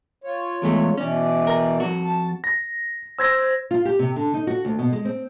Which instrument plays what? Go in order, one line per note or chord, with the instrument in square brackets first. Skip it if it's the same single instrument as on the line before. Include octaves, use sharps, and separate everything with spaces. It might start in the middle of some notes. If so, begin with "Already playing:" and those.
[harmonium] F4 C#5
[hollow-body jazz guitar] E2 G#3 A3
[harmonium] B2 E3 D5 [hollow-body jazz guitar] C#4
[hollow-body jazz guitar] A#4
F2 F#4
[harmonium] A5
[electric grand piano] A#6
[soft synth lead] C5 [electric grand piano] E6 G#6 A#6
[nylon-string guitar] F4
G4
C3
D3
D#4
F#4
D2
B2
G#3
C4